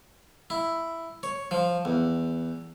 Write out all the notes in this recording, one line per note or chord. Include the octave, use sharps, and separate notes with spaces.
E4
C#5
F3
E2